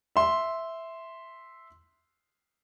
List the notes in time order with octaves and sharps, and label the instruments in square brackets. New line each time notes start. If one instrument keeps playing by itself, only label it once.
[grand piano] E5 C6